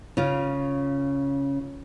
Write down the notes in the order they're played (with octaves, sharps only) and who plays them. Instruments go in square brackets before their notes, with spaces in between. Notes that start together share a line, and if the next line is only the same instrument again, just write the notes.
[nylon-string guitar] C#3 F4